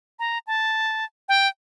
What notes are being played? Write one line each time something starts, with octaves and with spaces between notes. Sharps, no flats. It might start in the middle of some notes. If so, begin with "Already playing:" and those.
A#5
A5
G5